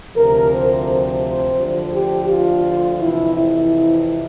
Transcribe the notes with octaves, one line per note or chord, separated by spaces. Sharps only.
D2 C3 F3 A#4
C5
D2 D3 F3
G4
F4
F2 C3 E3 E4
E4